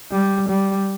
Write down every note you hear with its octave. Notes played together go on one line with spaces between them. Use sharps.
G3
G3